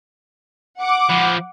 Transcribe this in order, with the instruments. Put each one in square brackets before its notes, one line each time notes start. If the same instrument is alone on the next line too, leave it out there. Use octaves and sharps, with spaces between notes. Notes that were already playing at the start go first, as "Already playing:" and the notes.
[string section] F#5 D6
[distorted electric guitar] F3 B4